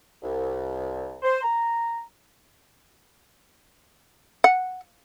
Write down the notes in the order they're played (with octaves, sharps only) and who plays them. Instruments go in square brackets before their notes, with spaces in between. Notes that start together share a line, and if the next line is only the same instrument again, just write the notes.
[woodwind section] C2
C5
A#5
[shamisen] F#5